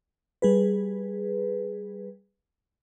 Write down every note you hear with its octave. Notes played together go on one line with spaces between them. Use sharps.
G3 G#4 B4